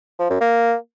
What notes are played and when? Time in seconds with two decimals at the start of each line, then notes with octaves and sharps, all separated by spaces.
0.19 F3
0.30 F#2
0.41 A#3